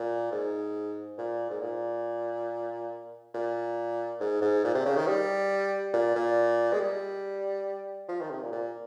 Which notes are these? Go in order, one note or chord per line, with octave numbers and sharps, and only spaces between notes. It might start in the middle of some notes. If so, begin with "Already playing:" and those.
Already playing: A#2
G#2
A#2
G#2
A#2
A#2
G#2
G#2
A#2
C3
C#3
D#3
G3
A#2
A#2
G#3
G3
F3
D#3
C3
A#2
A#2